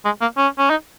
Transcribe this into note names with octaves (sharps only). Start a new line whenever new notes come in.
G#3
A#3
C#4
C#4
D#4